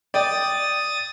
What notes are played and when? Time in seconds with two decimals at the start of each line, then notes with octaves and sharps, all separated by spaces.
0.14 D5 G5 D#6 A6